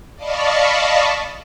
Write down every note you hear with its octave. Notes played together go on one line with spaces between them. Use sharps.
D5 D#5 F5 A5 B5 C#6